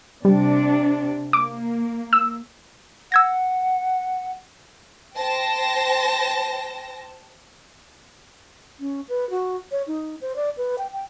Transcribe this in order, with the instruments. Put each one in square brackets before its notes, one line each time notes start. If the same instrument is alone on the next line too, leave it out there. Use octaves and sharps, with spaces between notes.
[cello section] C3 D4 [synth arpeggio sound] G3
[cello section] A#3 [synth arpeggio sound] D6
[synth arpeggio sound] E6
[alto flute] F#5 [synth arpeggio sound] E6 G#6 A#6
[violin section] C5 G5 A5 A#6
[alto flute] C#4
B4
F#4
C#5
D#4
C5
D5
B4
G5
G5